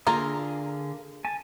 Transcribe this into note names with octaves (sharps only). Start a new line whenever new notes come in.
D3 A#3 D4 F4 G#4 A#4
G#5 A5